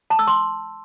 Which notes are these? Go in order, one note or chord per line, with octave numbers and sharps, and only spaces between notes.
A5
E6
C6